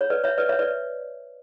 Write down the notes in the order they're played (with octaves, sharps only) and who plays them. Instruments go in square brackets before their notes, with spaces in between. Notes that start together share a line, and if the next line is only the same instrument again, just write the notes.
[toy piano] C#5
B4 D5
C#5 E5
B4 D5
C#5 E5
B4 D5